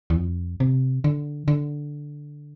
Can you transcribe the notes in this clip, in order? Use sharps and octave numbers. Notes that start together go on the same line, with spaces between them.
E2
F2
C3
D3
D3